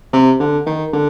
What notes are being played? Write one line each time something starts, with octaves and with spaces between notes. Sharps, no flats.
C3
D3
D#3
D3